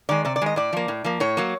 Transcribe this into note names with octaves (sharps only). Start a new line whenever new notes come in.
D#3 G#3 D5
C3 D5
D5
D#3 G#3 D#5
A2 D5
F3 A#3
A2
F3 A#3
A2 C#5
F#3 A#3